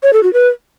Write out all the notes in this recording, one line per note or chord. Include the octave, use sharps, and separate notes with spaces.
C#5
A4
F#4
B4